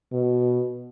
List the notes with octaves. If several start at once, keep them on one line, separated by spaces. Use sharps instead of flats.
B2